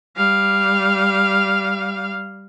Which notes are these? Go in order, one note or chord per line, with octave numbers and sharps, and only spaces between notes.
G3 F5